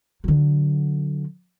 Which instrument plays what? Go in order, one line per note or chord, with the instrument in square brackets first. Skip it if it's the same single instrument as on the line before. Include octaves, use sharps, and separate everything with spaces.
[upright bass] D3 F#3